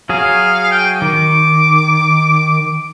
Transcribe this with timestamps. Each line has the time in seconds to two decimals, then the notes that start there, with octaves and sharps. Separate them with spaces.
0.09 F#3 G#4 F5
0.72 G5
1.02 D#3 D6